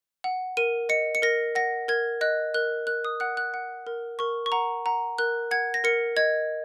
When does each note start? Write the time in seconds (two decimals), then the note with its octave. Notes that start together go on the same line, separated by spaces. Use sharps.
0.24 F#5
0.57 A#4 D#7
0.89 D#5 C#7
1.15 C#7
1.22 A#4 A#6
1.55 F#5 A#6
1.88 A#4 G#6
2.21 D#5 F#6
2.54 A#4 F#6
2.87 A#4 F#6
3.05 D#6
3.20 F#5 F#6
3.37 F#6
3.54 F#5
3.87 A#4
4.19 A#4 C#6
4.46 C#6
4.52 F#5 A#5
4.86 F#5 A#5
5.18 A#4 F#6
5.51 F#5 G#6
5.74 A#6
5.84 A#4 C#7
6.17 D#5 G#6